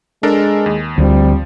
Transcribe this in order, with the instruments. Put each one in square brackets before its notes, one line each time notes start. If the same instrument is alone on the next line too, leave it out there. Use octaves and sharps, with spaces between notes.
[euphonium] G#3 [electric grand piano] D4 A4 A#4
[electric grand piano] D#2
[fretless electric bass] D2 [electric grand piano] F3 [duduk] G3 [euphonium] C4